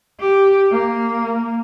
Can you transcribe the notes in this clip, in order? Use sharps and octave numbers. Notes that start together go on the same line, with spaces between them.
G4
A#3